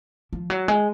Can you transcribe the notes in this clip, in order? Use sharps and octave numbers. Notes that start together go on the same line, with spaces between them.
F3
F#3
G#3